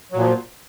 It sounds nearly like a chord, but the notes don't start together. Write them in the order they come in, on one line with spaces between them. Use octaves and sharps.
F#3 A#2 F3